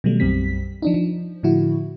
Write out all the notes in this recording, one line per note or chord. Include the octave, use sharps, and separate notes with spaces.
B2 D#3 F#3 G3 A3
B1 F#2 G3 C4 B6
F3 D4 D#4
F3
A2 D3 F3 E4 F#4